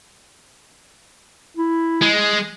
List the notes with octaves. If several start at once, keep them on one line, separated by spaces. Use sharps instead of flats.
E4
G#3